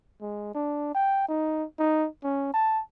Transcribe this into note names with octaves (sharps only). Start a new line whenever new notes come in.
G#3
D4
G5
D#4
D#4
C#4
A5